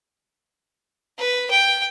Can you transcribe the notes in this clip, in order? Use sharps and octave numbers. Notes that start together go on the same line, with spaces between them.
B4
G5